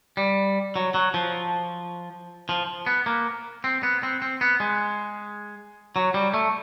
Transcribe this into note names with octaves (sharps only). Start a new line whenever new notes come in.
G3
F#3
F#3
F3
F3
B3
A#3
C4
B3
C4
C4
B3
G#3
F#3
G3
A3